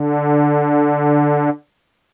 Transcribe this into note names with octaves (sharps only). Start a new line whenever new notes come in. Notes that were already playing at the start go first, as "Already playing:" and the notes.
Already playing: D3